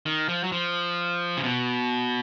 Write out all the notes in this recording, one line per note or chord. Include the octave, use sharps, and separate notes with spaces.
D#3
F3
F#3
F3
C#3
B2